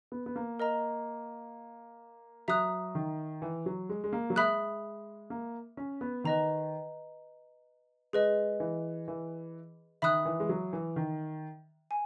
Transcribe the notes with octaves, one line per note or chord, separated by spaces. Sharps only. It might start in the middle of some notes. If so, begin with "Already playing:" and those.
B3
B3
A#3
A#4 D#5 A#5
F#3 E5 A#5 D#6 F#6
D#3
E3
F#3
G#3
G#3
A#3
F#3
G#3 E5 B5 D#6 F#6
A#3
C#4
B3
D#3 B4 D#5 A#5
G#3 G#4 B4 D#5
E3
E3
D#3 E5 B5 D#6 F#6
E3
G#3
F#3
E3
D#3
G#5